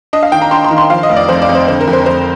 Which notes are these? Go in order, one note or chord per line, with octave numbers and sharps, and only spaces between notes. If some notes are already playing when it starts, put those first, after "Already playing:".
D4 D#5
F5
D#3 G5
A#5
D4 C6
C6
D#3
C6
F3 F5
D#5
F1
D5
F2 C5
D5
F2
C5
D3 C5
A#4
F2
C5
F2 C5